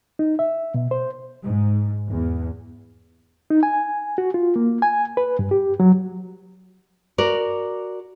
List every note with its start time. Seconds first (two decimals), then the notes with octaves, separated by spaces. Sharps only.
0.19 D#4
0.39 E5
0.74 B2
0.91 C5
1.43 G#2
2.09 E2
3.50 D#4
3.63 G#5
4.18 F#4
4.34 F4
4.56 A#3
4.82 G#5
5.17 B4
5.39 G2
5.51 G4
5.80 F#3
7.18 F#4 A#4 D5